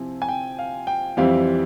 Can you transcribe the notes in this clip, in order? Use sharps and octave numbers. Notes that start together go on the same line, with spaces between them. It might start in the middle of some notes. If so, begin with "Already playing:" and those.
Already playing: C3 F3 C4 E4 G#5
G#5
G5
F5
G5
F2 E3 G3 C4 E4 F5